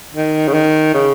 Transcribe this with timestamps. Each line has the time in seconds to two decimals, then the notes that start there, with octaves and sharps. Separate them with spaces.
0.14 D#3
0.48 C#3
0.54 D#3
0.94 C#3